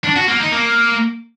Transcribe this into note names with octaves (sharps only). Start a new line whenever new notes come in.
D4
F#4
A#3
D#4
A#3